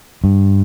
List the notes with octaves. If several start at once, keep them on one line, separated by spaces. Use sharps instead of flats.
G2